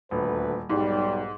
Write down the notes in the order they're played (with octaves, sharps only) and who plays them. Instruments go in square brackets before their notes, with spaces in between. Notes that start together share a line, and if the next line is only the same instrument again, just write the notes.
[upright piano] D#1 [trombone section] D2 B4
[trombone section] B1 G3 [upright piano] G#2